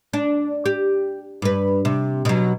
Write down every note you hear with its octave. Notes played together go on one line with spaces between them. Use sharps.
D4
G4
G2 B4
C3
B2 F#3